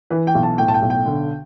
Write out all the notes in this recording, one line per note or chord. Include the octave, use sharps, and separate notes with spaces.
E3 B4
G5
B1
A5
A2 G5
A5
G5
B1
G5
D3